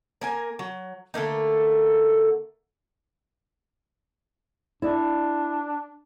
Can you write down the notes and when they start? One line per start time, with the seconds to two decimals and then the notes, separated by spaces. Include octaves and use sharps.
0.21 A#3 A#4 G#5
0.59 F#3
1.14 D3 A3 A#3 D#4
4.82 D4 E4 D5 E5